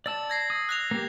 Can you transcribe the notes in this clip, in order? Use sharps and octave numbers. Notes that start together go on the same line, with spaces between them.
D5 A5 E6 A6
G#6 A#6 C7
D#6
F#6 A#6 F7
A#3 G4